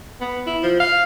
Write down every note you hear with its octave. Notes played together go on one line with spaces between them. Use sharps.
B3
E4
F3
F5